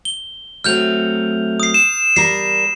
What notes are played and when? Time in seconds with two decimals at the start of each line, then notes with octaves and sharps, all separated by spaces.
0.05 G7
0.64 F#3 A3 C4 F6 G6 F7
1.60 D#6 C7
1.74 E7
2.16 G3 A#4 C7